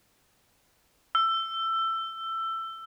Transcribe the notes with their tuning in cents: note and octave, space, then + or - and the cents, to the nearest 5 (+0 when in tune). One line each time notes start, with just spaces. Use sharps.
E6 +20